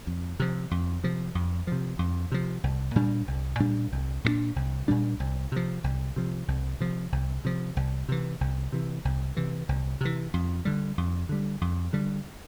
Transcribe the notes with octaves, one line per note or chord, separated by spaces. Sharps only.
F2
C3 F3
F2
C3 F3
F2
C3 F3
F2
C3 F3
C2
A#2 G3 D4
C2
A#2 G3 D4
C2
A#2 G3 D4
C2
A#2 G3 D4
C2
C3 F3
C2
C3 F3
C2
C3 F3
C2
C3 F3
C2
C3 E3
C2
C3 E3
C2
C3 E3
C2
C3 E3
F2
D3 G3
F2
D3 G3
F2
D3 G3